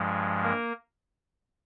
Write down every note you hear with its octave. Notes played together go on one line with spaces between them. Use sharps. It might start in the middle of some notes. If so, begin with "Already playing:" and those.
Already playing: G2 F3 G#3
A#3 A#4